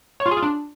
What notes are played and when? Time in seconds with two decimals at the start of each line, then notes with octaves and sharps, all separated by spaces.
0.20 C#5
0.26 F4
0.31 G#4
0.37 F4
0.43 D4